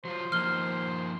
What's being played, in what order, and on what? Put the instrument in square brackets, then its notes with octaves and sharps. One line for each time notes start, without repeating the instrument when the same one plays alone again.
[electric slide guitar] F#3 F4 [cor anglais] C5
[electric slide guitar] F3 A#3 D#4 [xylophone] F6 G7